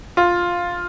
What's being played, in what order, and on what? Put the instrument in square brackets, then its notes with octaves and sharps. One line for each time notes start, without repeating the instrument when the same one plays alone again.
[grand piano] F4